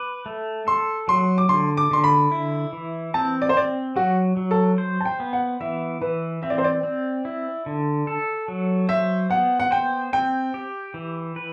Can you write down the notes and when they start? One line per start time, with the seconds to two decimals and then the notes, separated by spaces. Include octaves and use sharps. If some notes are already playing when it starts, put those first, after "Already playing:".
Already playing: B4 D6
0.26 A3
0.67 A4 C6
1.08 F#3 C6
1.38 D6
1.49 D3 C6
1.77 D6
1.91 D3 C6
2.04 B5
2.32 E4
2.73 E3
3.14 C4 A5
3.42 D5
3.49 C5
3.56 C4 D5
3.96 F#3 F#4
4.37 F#3
4.51 A4
4.78 C5
5.01 A5
5.05 G5
5.20 B3
5.33 F#5
5.60 E3 E5
6.01 E3 B4
6.43 C4 E5
6.50 D5
6.58 C5
6.64 D5
6.83 C4
7.25 E4
7.66 D3
8.07 A4
8.48 F#3
8.89 C5 E5
9.30 B3 F#5
9.60 F#5
9.71 C5 G5
10.13 C4 G5
10.54 G4
10.94 E3
11.36 B4